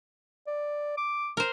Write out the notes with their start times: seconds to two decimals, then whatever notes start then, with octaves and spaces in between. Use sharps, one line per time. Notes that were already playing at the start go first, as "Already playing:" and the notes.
0.47 D5
0.97 D6
1.37 A#4 C5